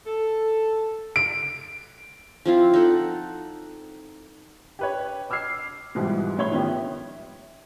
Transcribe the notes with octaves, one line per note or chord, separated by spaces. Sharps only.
A4
D7
F3 C4 E4 F4
D#4 A4 F#5
G4 B4 C#5
D6 E6 F6 G#6 C7
G#2 B2 E3 F3 G3
A2 F3 C#5 B5 C6 G7
D#3 F3 B3 C#4 G4
E5